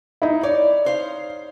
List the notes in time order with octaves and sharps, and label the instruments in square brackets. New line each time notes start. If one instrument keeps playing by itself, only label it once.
[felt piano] D#4 E4
[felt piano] C#5 [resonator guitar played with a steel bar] D5
[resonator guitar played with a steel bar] D#4 C5 F5